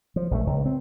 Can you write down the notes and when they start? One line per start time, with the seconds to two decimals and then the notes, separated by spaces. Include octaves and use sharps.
0.16 F3
0.31 A#1 D#3 A3
0.47 C#2
0.66 C4